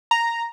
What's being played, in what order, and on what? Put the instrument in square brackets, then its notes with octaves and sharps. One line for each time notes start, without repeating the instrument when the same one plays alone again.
[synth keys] A#5